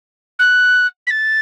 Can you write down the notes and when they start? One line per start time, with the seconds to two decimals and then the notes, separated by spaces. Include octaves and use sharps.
0.39 F#6
1.06 B6
1.10 A6